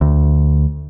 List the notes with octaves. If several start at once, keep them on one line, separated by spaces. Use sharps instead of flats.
D2